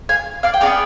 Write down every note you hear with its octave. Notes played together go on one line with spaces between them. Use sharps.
F5 G#5
D5 F5
G5
B3 D#4 G#4 D5 F5